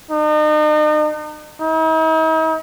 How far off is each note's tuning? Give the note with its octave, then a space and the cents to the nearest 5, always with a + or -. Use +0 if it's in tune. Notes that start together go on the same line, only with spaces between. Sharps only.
D#4 -40
D#4 +45